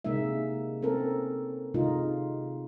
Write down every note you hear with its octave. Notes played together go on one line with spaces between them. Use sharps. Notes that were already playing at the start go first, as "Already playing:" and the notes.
C3 G#3 A#3 D#4 E5
C4 C#4 A4 A#4
C3 G#3 D#4 F4